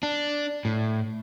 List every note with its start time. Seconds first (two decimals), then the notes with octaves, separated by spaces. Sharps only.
0.03 D4
0.65 A2